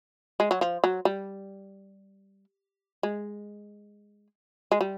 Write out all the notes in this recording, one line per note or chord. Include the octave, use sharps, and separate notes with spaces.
G#3
F#3
F3
F#3
G3
G#3
G#3
G3